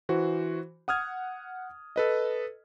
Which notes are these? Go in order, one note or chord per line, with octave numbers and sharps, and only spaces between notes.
E3 F#4 C5
F#5 D#6 F6 G#6
A4 B4 D#5